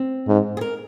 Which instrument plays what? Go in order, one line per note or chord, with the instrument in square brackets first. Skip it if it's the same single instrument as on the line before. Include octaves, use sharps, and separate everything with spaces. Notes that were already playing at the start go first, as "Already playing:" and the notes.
Already playing: [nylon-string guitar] C4
[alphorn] G#2
[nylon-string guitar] G#4
A#4